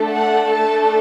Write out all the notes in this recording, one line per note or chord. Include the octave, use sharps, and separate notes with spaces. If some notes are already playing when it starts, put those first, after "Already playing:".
Already playing: A3 D4 A4
F#5
A5